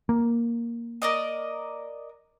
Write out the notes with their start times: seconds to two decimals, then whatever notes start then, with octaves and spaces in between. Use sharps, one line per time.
0.09 A#3
1.02 A#4 D5 D#5